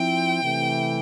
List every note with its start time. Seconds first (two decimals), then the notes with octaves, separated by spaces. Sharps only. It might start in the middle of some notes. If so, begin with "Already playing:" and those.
Already playing: F3 C4 E4 G5
0.43 C3 E3 A3